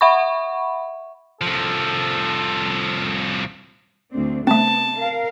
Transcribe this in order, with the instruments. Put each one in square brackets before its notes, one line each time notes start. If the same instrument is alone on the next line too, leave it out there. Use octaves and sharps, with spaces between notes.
[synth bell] E5 F#5 B5 C#6
[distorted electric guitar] C2 F3 [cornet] A4
[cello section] D2 C4 D4
[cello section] C3 B3 [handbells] A3 C4 [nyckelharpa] A5
[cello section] A#4 F5